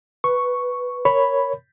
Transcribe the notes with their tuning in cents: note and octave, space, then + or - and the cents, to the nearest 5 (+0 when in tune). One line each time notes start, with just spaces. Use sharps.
B4 +0 C#6 +0
A#4 +0 C#5 +0 B5 +0